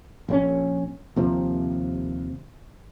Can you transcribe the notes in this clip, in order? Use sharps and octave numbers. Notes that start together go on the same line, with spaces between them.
A#1 C#3 C#4
D#2 C3 F3